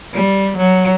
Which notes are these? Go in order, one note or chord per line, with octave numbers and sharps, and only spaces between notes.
G3
F#3